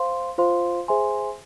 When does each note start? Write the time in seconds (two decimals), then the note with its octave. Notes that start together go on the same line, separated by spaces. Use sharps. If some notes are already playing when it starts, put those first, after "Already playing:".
Already playing: C5 F5 C6
0.38 F4 C5 F5 C6
0.88 G#4 C5 E5 G#5 C6